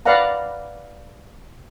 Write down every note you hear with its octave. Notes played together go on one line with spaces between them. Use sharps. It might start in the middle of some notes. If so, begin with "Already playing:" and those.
B4 D5 F5 F#5 A#5